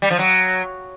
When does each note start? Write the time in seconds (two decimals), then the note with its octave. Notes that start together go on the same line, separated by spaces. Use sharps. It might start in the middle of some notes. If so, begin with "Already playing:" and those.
0.02 G3
0.11 F3
0.19 F#3